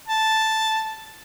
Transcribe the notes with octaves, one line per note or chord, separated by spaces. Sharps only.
A5